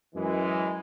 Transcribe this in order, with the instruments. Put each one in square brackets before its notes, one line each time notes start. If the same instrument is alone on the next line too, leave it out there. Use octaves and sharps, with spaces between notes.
[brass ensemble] F#2 E3 G#3